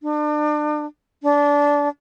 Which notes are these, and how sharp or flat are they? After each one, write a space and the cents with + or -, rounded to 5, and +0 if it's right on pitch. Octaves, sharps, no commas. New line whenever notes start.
D4 +35
D4 -20